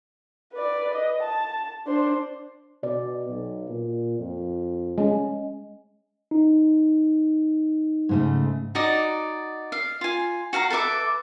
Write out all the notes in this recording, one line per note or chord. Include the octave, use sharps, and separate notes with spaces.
B4 D5
D#5
A5
D4 C5
B2 D5
B1
A#2
F2
G#3 C#4
D#4
G#2 C#3 A3
D#4 F#4 D5 D#5
F5
F4 G#5
F#4 F5 F#5 A#5
A4 B4 E5 D6